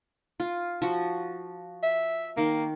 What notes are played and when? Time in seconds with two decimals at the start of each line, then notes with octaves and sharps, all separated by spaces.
0.40 F4
0.82 F3 F#4
1.83 E5
2.37 D#3 A#3